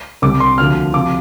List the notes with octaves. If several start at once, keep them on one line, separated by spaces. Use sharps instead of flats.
C2 C3 G3 D6
C6
D2 D3 F3 F6
C3 F3 D6